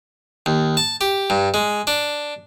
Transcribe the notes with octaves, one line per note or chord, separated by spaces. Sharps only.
D#2
A5
G4
G2
G#3
D4